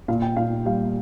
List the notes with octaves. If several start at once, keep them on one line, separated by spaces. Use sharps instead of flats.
A#2 F5
G5
A#2 F5
G3 F5